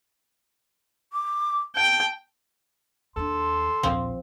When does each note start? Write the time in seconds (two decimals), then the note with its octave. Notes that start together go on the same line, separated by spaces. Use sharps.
1.13 D6
1.76 G5 A5
3.16 D#2 D4 A4 C6
3.83 A#1 D#2 F3 C4